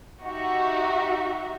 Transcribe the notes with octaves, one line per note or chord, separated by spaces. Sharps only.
D#4 F#4 G4 E5